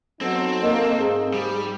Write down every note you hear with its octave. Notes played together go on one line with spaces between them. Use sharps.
F#3 B3 C4 D#4 A4
A#3 D#5
G#2 G#4
G3